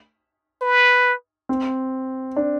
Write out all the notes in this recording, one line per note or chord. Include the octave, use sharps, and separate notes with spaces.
B4
C4
D4